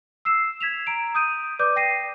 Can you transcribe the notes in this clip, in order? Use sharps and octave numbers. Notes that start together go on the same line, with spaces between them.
E6 C7 E7
G#6 B6 E7 F7
A#5 D7
D#6 G6 D#7
B4 D5 D6 G6
G5 A#6 C7 D#7